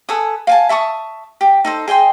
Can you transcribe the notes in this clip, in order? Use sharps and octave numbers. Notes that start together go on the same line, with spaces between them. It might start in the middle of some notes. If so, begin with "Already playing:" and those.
A4 B4 G#5 D#6
F5 G#5 A5
E5 A5 C#6 D#6
G4
D#4 A4 C5
G#4 D#5 G5 C6